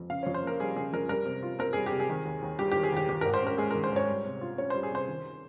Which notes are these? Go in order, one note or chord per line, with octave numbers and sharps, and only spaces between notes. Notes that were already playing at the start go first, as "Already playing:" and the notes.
Already playing: F2
C#3 F5
F2 C#5
C5
A#3 A#4
G3 G#4
C#3 G#4
F2 A#4
G3 A#4
C3
F4
C4 A#4
G3 G#4
G4
C3
G#4
D#3
D#2
D#2
G3 G4
D#3 G4
G#4
D#2 G4
D#3 G4
G#2 A#4
C5
C#4 A#4
G#3 G#4
D#3 A#4
C5
G#2 C#5
G3
C3
F4
C#4 C#5
G3 C5
G#4
C3 C5
D#3